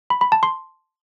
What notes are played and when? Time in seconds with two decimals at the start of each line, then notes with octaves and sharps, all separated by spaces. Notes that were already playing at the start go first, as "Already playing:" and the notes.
0.10 B5
0.21 B5
0.32 A5
0.43 C6